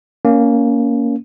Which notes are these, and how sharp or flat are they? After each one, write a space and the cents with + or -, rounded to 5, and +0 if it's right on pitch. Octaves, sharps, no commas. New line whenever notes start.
A#3 +0 C#4 +15